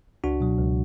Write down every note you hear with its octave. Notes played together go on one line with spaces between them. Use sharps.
C#2 D4 F#4
B2 F#3
C#2